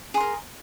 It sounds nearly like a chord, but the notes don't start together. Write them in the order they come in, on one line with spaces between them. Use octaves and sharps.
G#4 C6 A#4